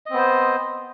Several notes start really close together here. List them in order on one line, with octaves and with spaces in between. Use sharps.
D#5 C4 B3 C5